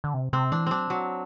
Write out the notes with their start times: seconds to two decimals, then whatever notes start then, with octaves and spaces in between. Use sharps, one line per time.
0.04 D3
0.14 C3
0.33 C3 C4
0.52 E3 D4
0.66 F#3 C4 D4
0.90 F#3